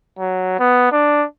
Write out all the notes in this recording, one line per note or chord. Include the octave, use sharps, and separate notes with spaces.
F#3
B3
D4